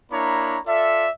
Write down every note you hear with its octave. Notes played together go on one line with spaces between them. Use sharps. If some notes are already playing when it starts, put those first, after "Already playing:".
A#3 D4 E4 C#5 A#5 B5
F4 A4 D5 E5